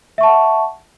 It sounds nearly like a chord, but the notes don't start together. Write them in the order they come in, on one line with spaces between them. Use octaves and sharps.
E5 C#6 A5 F#5